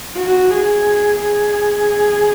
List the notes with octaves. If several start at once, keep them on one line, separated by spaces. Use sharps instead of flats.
F#4
G#4
G#4